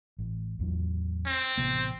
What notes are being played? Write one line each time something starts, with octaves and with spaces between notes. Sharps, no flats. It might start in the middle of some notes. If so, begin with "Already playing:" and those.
A1
A1 E2 F#3
C4
A1 C3 B3